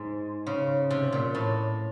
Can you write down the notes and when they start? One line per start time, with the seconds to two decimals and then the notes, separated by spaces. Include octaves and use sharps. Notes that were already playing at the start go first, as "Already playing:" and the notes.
Already playing: G#2
0.47 C#3
0.90 C3
1.12 A#2
1.35 A2